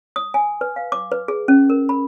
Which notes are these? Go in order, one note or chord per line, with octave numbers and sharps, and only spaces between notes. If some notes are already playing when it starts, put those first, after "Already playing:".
D#6
G#5
B4
F5
D6
B4
G#4
C#4
A#4
B5